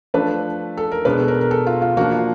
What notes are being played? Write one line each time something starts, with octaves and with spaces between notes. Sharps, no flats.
F3 A3 D4 B4
A4
A#4
B2 G#3 B3 D4 B4
A4
A#4
A#4
A4
F4
F4
F3 A#3 D4 F#4
F4